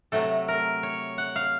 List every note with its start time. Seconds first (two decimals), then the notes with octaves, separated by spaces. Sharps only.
0.12 C3 F#3 A3 A4
0.48 A#4
0.83 C#5
1.18 F#5
1.36 F5